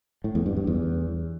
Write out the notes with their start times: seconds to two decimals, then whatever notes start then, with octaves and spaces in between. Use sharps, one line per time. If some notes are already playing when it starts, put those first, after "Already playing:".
0.24 A2
0.35 E2
0.46 G2
0.57 G2
0.67 E2